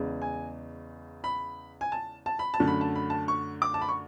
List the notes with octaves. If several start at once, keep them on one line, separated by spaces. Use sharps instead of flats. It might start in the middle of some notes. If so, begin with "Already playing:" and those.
Already playing: E2 C#3 G#3
G#5
B5
G#5
A5
A5
B5
A5
F#2 D3 A3
B5
A5
B5
A5
C#6
D6
A5
B5
C#6